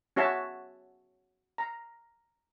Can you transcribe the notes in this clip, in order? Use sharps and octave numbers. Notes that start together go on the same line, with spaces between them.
C#4 F#4 C#5 E5 A5
A#5